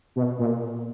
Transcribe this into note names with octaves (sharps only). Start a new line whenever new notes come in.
B2
A#2